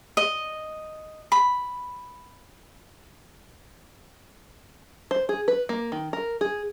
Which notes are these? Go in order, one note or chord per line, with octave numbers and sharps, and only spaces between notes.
D#5
B5
C5
G#4
B4
A#3
D#3
A#4
G#4